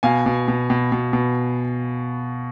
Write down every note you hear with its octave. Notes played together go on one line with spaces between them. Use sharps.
B2 F5 G#5
B2
B2
B2
B2
B2